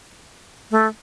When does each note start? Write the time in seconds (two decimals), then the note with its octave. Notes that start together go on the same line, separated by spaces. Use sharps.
0.71 A3